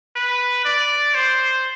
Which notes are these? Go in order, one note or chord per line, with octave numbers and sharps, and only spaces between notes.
B4
D5
C5